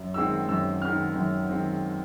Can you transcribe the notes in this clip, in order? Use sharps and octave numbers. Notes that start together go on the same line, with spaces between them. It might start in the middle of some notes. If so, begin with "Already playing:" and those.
Already playing: F#2
D#3 G#3 C4 E6
F#2 E6
D#3 G#3 C4 F6
F#2
D#3 G#3 C4